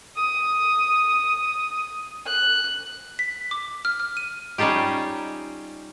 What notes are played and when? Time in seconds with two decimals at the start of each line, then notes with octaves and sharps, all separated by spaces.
0.16 D#6
2.26 F#6
3.19 B6
3.51 D6
3.85 F6
4.00 F6
4.17 D#7
4.58 G3 C#4 D#4 F4 G4